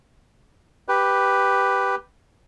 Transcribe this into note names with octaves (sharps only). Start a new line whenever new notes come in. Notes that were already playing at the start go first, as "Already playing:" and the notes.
G4 B4